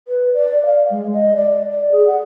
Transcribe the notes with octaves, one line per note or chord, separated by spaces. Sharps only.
B4
D5
F5
G#3
D#5
D5
D5
G#4
F#5